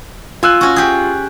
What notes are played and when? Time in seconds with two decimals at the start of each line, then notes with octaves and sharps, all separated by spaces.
0.43 F4 G#5 E6 F#6
0.61 C#4 F#4
0.76 G4 G#4